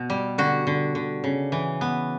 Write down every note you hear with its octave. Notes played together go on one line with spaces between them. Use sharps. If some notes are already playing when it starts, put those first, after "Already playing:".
Already playing: B2
G3
D3 F#4
D3
D3
C#3
E3
B3